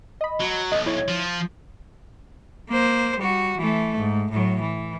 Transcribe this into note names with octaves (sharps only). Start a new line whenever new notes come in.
D#5 B5
F#3
B1 D#5
E4 C#5 G#6
F3
A#3 C5
G3 F#4
E3 A3
G#2
A2 F#3
E3